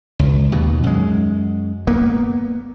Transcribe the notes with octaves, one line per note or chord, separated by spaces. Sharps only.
C#2
D#2 B2
F#2 G#3
A#3 B3